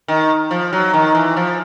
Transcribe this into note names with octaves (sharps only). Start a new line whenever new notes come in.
D#3
F3
F#3
D#3
E3
F3